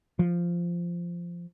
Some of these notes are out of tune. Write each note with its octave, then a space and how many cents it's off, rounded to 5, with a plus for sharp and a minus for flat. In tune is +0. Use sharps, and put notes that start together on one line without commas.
F3 -10